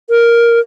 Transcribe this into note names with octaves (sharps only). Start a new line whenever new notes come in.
A#4